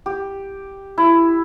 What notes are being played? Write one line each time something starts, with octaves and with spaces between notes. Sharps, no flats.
G4
E4